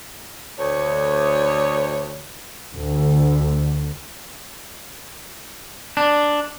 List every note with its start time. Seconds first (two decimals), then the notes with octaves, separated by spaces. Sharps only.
0.58 D2 C#5
2.74 D2
5.97 D4